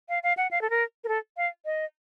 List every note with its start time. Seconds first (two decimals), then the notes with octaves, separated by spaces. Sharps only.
0.09 F5
0.23 F5
0.37 F#5
0.51 F5
0.61 A4
0.70 A#4
1.04 A#4
1.08 A4
1.37 F5
1.65 D#5